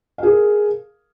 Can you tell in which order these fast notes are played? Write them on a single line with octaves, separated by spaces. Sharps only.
F5 G#4 A#4